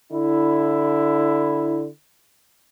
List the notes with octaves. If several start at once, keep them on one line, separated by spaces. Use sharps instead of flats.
D3 E4